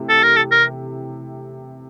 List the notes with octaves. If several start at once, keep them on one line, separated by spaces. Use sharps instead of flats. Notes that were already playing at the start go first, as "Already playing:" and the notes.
Already playing: C3 E3 A3
A4
A#4
A4
A#4